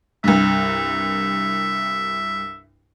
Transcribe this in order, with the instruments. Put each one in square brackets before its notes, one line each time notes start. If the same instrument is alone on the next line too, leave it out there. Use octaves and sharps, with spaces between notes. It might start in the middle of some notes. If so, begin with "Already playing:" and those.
[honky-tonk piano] C2 G2 [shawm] E5